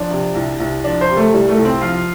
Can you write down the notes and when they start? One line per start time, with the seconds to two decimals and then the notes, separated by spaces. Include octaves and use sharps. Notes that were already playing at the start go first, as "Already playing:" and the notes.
Already playing: F3 D4
0.11 C3
0.35 C2
0.60 C2
0.84 F3 D4
1.01 C5
1.09 C3
1.17 A3
1.32 C2 G3
1.49 A3
1.57 C2
1.65 C4
1.81 F3 F4